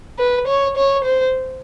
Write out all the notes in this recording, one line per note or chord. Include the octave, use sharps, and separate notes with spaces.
B4
C#5
C#5
C5